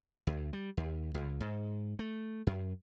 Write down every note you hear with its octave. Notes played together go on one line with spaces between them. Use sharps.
D2
G3
D#2
C#2
G#2
A3
F#2